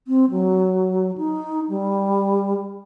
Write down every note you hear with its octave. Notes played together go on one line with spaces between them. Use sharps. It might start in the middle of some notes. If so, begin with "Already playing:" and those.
C4
F#3
D#4
G3